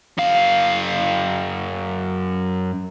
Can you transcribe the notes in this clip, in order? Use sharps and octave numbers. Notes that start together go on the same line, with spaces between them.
F#2 F5